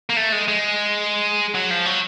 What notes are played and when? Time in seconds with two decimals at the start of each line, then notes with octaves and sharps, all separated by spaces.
0.10 A#3
0.17 A3
0.32 G#3
0.48 G#3
1.55 F#3
1.70 F3
1.86 F#3